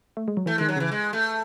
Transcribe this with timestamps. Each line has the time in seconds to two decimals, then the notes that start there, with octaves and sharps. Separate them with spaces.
0.17 A3
0.28 G#3
0.37 F#3
0.46 E3 A3
0.58 D#3 G#3
0.69 F#3
0.76 C#3 E3
0.92 G#3
1.13 A3